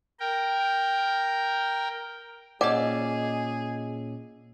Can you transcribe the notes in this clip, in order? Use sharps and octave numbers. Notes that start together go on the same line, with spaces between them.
A#4 G5
A#2 C#4 G#4 D5 D#5 F#5 G#5 E6